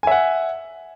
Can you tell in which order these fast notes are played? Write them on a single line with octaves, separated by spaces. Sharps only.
G#5 E5 F#5